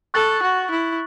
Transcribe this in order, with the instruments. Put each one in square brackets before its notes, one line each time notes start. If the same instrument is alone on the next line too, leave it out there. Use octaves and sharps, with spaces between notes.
[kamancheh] A4 [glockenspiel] C#6 F#6 A6 F#7
[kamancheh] F#4
E4